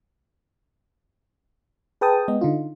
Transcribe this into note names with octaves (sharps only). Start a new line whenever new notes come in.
G#4 B4 G5 A5 D#6
G#3 B3 D#5
D3 D#4 F4